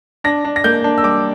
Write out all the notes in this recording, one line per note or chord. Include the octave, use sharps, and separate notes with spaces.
D4 A#6
D4
A#6
A#3 G6
D4
E6
G3 D6